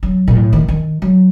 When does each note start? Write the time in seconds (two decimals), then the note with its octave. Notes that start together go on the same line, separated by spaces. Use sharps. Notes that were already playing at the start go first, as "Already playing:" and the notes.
0.03 F#3
0.28 A#2
0.36 A2
0.53 D#3
0.68 D#3
1.02 F#3